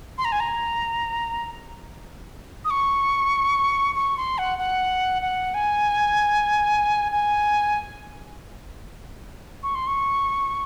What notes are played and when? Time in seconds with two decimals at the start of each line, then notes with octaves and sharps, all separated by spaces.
0.18 C6
0.25 A#5
0.32 G#5
0.40 A#5
2.65 D#6
2.70 C#6
3.95 C#6
4.17 C6
4.38 F#5
4.59 F#5
5.22 F#5
5.54 G#5
7.12 G#5
9.63 C#6
9.75 C6
9.87 C#6